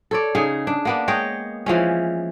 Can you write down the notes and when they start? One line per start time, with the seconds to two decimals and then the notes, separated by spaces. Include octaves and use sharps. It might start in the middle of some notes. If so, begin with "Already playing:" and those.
0.11 A4 C#5 D5
0.35 C#3 D#4 G#4
0.67 D4
0.85 A#3 B3 D4
1.08 G#3 C#5 D#5 G5
1.66 E3 F3 G#3 C#4